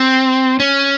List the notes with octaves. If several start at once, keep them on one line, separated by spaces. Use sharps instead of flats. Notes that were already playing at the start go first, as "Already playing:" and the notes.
Already playing: C4
C#4